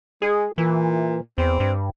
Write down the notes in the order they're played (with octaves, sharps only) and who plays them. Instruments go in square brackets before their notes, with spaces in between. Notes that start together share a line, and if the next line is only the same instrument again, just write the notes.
[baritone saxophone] G#3 [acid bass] G#4
[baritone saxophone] A#2 [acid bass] E3
[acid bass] E2 [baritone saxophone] C4
[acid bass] G2